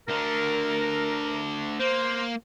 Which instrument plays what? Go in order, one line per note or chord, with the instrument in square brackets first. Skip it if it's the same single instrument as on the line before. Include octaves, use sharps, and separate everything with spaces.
[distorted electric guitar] D2 D3 [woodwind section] A#4
[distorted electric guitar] A#3 [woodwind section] C5